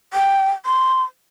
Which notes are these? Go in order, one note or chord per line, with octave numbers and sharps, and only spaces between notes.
G5
C6